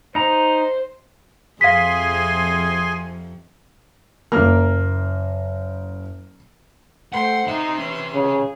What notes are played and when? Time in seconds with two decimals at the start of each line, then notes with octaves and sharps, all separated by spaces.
0.15 D#4 C5 A#5
1.61 F2 C3 F3 G#4 F5 G#5 C6 B6
4.32 F#1 A#3 A#4 F6
7.13 A3 C5 F#5 G5 C6
7.47 C3 D#4 E5 C6
7.78 E3 C#4
8.14 C#3 G#4